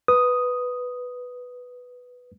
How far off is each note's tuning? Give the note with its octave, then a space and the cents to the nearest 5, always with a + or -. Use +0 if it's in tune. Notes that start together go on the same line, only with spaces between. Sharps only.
B4 +0 D#6 +0